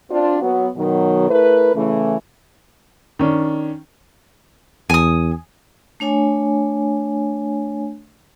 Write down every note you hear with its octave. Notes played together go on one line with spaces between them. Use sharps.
C4 D4 F4
F#3 B3
B2 D#3 F#3
A3 E4 A#4 B4
C#3 E3 A3
D#3 C#4 D4
E2 G#5 D#6
A3 D4 C#5 G#5